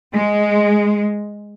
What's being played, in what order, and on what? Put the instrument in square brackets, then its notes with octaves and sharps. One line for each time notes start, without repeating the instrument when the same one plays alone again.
[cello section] G#3